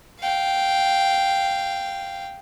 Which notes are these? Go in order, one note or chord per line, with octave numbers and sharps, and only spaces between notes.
F5 G5